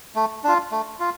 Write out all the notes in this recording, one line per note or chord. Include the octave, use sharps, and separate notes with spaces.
A3
D4 F4
A3
F4